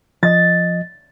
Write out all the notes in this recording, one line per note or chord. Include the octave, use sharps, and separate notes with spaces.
F3 D#5 A6